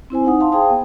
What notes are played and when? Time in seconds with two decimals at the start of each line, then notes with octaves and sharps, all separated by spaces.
0.10 C4 E4 C5 G#5
0.25 D#4 F#5 D#6
0.40 F5 A5 C6
0.52 G#4 C5 F5 G5 A5 D#6
0.70 B3